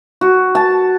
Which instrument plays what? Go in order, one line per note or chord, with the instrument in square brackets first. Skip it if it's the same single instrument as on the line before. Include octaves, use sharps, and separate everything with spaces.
[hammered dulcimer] F#4
A5